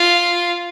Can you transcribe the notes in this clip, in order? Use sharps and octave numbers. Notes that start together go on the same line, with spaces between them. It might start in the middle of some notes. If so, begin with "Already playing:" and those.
Already playing: F4